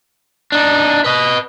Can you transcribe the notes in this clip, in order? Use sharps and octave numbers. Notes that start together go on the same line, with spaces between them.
D4 D#4
B4 D#5